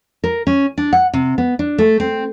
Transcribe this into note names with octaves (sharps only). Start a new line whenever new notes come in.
A#4
C#4
D4
F#5
C3
B3
D4
A3
C4